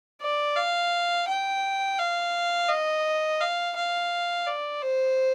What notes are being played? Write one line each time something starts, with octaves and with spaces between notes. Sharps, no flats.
D5
F5
G5
F5
D#5
F5
F5
D5
C5